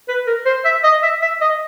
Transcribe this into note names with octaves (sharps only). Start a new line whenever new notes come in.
B4
A#4
C5
E5
D#5
E5
E5
D#5